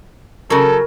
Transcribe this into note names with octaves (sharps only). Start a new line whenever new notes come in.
C#3 F#3 A4 A#4